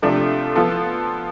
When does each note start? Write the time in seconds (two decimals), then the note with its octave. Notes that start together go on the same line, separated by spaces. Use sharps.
0.02 C3 F3 A3 D4 F4
0.55 F3 B3 F4 A4